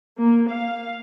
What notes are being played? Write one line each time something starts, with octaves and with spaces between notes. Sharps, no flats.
A#3
F5